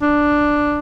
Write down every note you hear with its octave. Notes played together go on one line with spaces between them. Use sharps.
D4